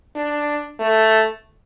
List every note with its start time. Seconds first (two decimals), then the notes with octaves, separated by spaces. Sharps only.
0.16 D4
0.80 A3